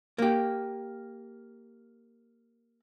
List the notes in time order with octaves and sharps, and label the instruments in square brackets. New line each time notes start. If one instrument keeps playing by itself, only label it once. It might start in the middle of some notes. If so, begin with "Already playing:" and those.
[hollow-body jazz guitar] A#3 G4